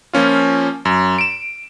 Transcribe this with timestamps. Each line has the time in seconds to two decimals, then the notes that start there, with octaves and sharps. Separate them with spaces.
0.13 F3 A#3 C#4 F4
0.85 F#2
1.18 D7 E7